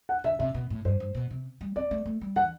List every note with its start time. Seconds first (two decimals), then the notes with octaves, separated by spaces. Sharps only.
0.09 F#5
0.24 D3 E5
0.39 C3 E5
0.54 B2
0.70 A2
0.85 G2 C5
1.00 G2
1.15 B2
1.31 C3
1.61 G3
1.76 C4 D5
1.91 A3
2.06 A3
2.21 G3
2.36 E3 F#5